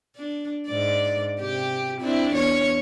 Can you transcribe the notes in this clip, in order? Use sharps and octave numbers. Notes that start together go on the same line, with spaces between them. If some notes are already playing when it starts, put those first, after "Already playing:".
D4
G#2 D5
C3 G4
C4 D4 E4
E2 C#5